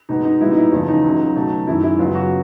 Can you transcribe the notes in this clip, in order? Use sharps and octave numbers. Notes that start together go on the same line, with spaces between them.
B2 G#3 B3 D#4
D#4
A#2 G3 B3 E4
D#4
E4
E2 C#3 F3 A3 E4
D#4
C#2 C#3 F#3
B2 F#3 A3
F#2 D#3 G#3 E4
E4
F#2 C#3 F#3 B3 F4
F#4